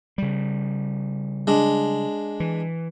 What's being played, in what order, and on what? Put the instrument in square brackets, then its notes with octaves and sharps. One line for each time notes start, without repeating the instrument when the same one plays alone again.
[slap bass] C#3 G3
[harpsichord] G#3 D4
[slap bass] E3